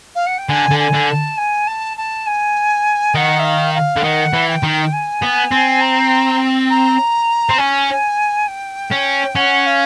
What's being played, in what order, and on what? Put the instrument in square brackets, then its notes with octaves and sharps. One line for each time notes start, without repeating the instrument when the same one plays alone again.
[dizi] F5
F#5
G5
[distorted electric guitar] D3 [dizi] G#5
[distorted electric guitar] D3
[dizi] G#5
[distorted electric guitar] D3
[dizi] A5
G#5
A5
A5
G#5
[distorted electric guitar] D#3 [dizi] F#5
[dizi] E5
F5
F5
[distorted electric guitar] D3
[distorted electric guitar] D#3 [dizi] F#5
[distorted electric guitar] E3
[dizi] G5
[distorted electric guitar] D#3
[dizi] G#5
[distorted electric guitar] B3
C4
[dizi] A#5
A#5
[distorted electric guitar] C4
[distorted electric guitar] C#4 [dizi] G#5
[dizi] G5
[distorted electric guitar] C#4
[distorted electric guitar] C#4 [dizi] F#5
[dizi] F5